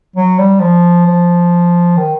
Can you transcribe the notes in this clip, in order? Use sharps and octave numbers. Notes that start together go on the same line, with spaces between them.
F#3
G3
F3
F3
D#3